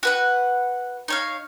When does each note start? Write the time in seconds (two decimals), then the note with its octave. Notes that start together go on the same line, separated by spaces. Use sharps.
0.03 F#4 B4 F#5
1.08 D#4 C#5 F5